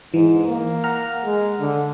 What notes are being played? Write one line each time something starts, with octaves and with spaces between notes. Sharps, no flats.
G#2 E3
A#3
F#5 A#5 F6
G#3
D3